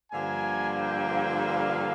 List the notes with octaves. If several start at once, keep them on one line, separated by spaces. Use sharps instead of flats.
G2 D3 F3 A#3 G#5
G5
F5